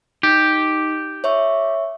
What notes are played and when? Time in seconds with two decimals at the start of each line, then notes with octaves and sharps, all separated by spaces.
0.23 D#4 G4
1.24 C#5 E5 C#6